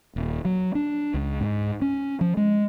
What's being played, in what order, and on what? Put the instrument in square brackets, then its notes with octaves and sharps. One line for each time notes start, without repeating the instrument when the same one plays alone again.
[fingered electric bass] D#1
F#3
D4
C#2
G#2
C#4
F3
G#3